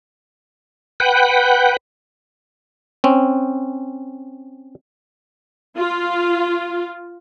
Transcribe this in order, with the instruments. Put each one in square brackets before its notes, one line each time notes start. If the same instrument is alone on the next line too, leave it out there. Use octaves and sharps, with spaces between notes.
[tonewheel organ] B4 F#5 G5
[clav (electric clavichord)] C4 C#4
[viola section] F4